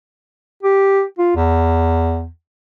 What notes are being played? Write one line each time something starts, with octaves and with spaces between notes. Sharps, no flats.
G4
F4
E2